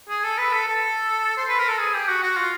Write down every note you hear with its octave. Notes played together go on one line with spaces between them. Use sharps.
G#4
A4
B4
A4
A4
C5
B4
A#4
A4
G#4
G4
F#4
F#4
F4